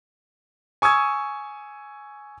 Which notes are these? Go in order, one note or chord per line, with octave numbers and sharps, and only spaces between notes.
G#5 C#6 D#6 E6 G#6